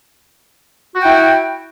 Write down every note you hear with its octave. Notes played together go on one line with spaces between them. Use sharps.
E4 F#4 G5